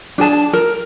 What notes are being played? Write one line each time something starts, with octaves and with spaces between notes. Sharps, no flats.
D4 G#4 A5
A#4